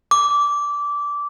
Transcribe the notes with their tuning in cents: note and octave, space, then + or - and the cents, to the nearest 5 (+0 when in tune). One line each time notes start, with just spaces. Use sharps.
D6 -15